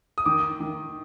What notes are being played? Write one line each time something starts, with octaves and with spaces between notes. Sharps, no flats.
D#6
D#3 D6
D#3